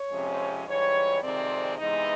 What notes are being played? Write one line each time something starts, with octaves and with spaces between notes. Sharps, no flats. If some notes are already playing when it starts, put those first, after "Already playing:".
Already playing: C#5
F2 C3 F3 G#3 C#4
G#2 E3 G3 C#5
F2 C3 D#3 G#3 C4 D5
C3 E3 G#3 B3 D#4 D#5